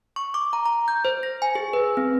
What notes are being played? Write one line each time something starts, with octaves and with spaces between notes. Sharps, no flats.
C#6
D6
A#5
A#5
G6
C5
A#6
G#5
G#4
B4
C4